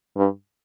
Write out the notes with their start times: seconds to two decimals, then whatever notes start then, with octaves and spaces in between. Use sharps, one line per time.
0.17 G2